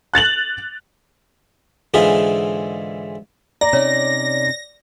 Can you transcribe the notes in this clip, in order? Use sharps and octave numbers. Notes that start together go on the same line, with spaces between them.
F#6 A6 F7 F#7
G#2 D3 E3 D#4 F4 G#4
D5 A#5 A#6
C3 C#4 D#4 C#5